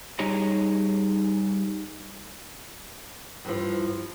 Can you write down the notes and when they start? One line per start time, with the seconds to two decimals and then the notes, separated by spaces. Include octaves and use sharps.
0.19 G3 D#4 G4 G#4 C#5 A#5
3.45 G2 E3 F3